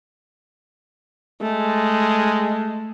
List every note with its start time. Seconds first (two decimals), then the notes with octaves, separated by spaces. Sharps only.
1.41 G#3 A3